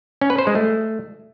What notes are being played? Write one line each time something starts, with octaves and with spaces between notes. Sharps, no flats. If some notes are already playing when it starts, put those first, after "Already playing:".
C#4
B4
C5
G#3
A3